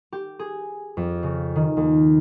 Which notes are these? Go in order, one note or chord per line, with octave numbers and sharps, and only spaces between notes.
G4
G#4
F2
C#3
D#3
D#2